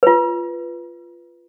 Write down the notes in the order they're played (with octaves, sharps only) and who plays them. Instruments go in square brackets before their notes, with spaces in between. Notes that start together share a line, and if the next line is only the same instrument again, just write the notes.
[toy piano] F4 B4